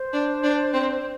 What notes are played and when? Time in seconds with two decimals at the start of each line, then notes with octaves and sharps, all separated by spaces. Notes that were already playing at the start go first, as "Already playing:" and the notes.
Already playing: C5
0.13 D4
0.43 D4
0.73 C4